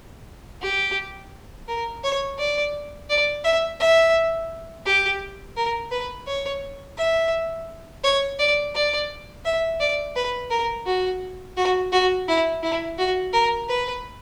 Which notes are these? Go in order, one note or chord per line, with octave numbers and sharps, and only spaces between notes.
G4
A#4
C#5
D5
D5
E5
E5
G4
A#4
B4
C#5
E5
C#5
D5
D5
E5
D5
B4
A#4
F#4
F#4
F#4
E4
E4
F#4
A#4
B4